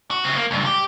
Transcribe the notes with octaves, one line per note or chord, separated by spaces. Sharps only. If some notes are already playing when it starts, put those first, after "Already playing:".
F#4
C#3 C4
A#3
C#2 G2
G4